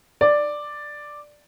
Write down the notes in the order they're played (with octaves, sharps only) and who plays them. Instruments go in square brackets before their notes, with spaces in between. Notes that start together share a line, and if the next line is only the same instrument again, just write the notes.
[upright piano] D5